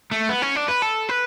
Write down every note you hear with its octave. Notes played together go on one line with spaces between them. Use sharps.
A3
B3
C#4
D4
B4
A4
B4